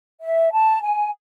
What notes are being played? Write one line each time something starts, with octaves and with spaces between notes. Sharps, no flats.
E5
A5
G#5